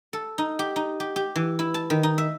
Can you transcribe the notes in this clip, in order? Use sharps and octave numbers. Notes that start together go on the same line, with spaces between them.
A4
D#4
G4
D#4
G4
G4
E3
E4
A5
D#3
D#4
E5